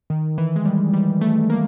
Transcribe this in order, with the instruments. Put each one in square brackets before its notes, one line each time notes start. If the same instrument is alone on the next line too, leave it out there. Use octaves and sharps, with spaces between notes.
[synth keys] D#3
E3
G#3
G3
G3
A3
A#3